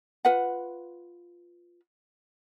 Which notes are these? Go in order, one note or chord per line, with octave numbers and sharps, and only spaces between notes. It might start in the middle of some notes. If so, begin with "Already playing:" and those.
F4 B4 F#5